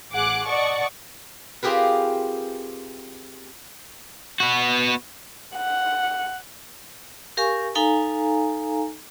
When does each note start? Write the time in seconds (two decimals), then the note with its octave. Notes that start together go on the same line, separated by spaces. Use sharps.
0.13 A1 G#4 F#5 D6 F#6
0.46 D5 D#5 F#5 A5 C#6 D6
1.63 C4 F4 G4 G#4 A#4 B4
4.40 B3 F#4
5.57 F#5
7.37 G4 A#4 F5 G#5 C#6
7.75 D#4 A4 F5 G#5 A#5